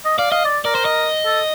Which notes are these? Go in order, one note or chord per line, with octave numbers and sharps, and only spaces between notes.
D#5
D5 F5
D#5 F5
D5
A#4 D5
C5
D#5
A4